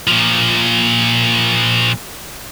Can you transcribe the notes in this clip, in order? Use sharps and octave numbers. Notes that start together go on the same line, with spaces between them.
A#2 F3